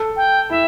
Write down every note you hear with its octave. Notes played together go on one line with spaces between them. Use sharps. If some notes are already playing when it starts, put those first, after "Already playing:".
Already playing: A4
G5
E4 E5